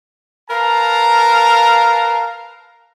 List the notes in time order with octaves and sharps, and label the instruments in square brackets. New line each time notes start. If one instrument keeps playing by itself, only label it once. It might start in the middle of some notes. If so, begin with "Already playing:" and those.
[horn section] A#4 B4 F5 A5 A#5